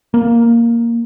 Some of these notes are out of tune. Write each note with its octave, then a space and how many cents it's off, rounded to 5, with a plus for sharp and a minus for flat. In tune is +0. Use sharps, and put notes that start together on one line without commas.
A#3 +0